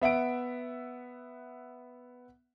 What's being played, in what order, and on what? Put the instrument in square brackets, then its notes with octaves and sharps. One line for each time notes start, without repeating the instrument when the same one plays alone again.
[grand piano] B3 E5 F#5 D7